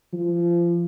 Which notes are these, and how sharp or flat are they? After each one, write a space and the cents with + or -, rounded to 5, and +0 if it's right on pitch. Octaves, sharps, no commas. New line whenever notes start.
F3 -30